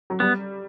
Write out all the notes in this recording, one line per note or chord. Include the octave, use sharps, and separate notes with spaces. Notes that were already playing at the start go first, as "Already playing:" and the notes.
F#3
G3 B3